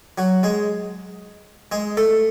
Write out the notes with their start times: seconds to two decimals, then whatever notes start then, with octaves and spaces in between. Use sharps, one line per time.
0.18 F#3 F#4
0.43 G#3 G#4
1.72 G#3 G#4
1.97 A3 A4